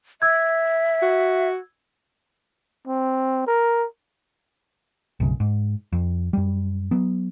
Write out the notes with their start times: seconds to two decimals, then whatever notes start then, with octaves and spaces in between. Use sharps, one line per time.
0.22 E5 E6 G#6
1.02 F#4
2.87 C4
3.47 A#4
5.20 B1 F#2 C#3
5.40 G#2
5.93 F2
6.33 F#2 G3
6.91 F#3 B3